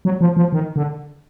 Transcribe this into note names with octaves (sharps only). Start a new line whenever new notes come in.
F#3
F3
F3
D#3
D3